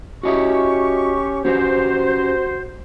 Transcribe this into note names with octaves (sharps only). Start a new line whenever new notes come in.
C#4 F#4 G4 D#5 E5 C#6
C#4 F#4 G4 B4 C5